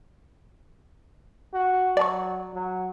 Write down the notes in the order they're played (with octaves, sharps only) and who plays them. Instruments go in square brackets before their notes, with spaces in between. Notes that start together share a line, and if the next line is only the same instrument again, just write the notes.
[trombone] F#4
[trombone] F#3 [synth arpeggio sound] D5 A5 C#6
[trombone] F#3